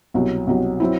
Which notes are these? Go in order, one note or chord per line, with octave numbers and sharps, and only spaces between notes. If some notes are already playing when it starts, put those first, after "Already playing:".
C2 B2 F#3
C2 B2 F#3
F#3 C4 E4